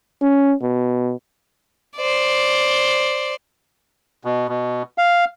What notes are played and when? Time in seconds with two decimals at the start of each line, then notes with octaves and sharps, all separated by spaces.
0.22 C#4
0.62 B2
1.96 C5 D5
4.25 B2
4.48 B2
4.98 F5